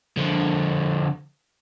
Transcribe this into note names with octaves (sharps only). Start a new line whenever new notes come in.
D3 F3